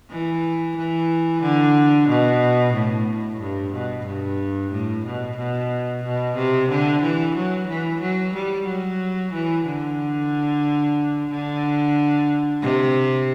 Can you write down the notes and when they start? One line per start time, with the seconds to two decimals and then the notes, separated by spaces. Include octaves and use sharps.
0.10 E3
0.76 E3
1.42 D3
2.08 B2
2.74 A2
3.40 G2
3.73 B2
4.05 G2
4.72 A2
5.05 B2
5.37 B2
6.04 B2
6.36 C3
6.69 D3
7.02 E3
7.36 F#3
7.68 E3
8.01 F#3
8.34 G3
8.66 F#3
9.33 E3
9.65 D3
11.31 D3
12.62 C3